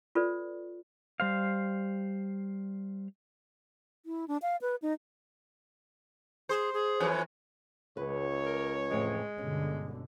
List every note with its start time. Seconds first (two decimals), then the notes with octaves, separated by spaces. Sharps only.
0.15 F4 A4 B4 D5
1.20 G3 C5 F5
4.06 E4
4.28 D4
4.42 F5
4.62 B4
4.82 D#4
6.49 G#4 C5
6.73 G#4
7.00 F2 E3 F#3
7.97 C#2 B4 C#5
8.46 A#4
8.91 F2 A2 E3 G#3
9.38 G1 B2 D3 C#4